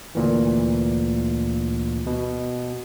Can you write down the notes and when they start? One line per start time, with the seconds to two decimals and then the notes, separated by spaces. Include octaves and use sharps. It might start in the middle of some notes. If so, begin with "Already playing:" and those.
0.15 D2 A#2 E3
2.07 B2